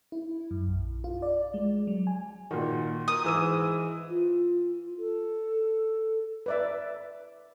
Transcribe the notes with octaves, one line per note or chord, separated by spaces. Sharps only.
E4
F#2
A#1
F4
D5
G#3
F#3
G#5
A#2 D#3 F#4
A#4 D#6
G#2 E3 E6 D#7
F4
A4
B4 D5 E5